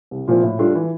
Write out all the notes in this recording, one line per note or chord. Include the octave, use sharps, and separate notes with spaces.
C2
A#2 F3 C4 E4
A2
G3 D4 F4 A4
E3